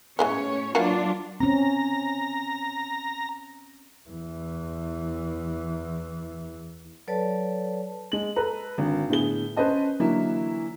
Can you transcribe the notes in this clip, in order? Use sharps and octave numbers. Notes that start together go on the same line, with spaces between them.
E3 G#3 A3 B3 C#4 C#5
E3 F#3 A#3 D4 F4 F#4
C4 C#4 A#5
E2 E3
F#3 A4 B4 C#5 D5 A5
G#3 F#7
A4 B4 A#5
G#1 D3
A2 D3 B3 G#4 G7
C#4 B4 C5 D#5 A5
D3 E3 F#3 A#3 E4